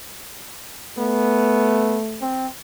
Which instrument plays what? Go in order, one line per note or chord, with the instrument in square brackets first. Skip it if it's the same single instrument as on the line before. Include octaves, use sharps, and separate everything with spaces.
[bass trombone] A3 [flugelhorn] B3
[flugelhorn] C4